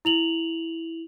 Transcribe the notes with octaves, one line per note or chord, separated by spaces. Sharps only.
E4 F7 F#7